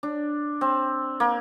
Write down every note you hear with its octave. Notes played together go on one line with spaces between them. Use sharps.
D4
C4
A#3